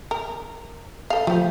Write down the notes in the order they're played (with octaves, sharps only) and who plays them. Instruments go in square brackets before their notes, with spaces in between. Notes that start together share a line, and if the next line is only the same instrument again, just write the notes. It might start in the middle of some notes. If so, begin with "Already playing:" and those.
[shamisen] A#4
A4 F5
[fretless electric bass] F3 [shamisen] A3 G4